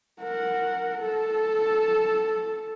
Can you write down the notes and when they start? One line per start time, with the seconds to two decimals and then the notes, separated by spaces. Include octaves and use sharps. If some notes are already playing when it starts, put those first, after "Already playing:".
0.22 A#4 F#5
1.01 A4